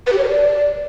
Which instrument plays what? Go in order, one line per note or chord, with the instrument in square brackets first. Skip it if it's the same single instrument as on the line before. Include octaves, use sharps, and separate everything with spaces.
[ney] B4
G4
C#5
A#4
D5